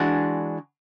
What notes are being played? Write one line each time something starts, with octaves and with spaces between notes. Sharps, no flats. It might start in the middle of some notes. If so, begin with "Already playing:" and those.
Already playing: E3 G#3 D4 F#4